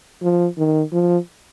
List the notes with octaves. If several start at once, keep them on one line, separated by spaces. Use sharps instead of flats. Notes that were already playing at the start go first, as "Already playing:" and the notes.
F3
D#3
F3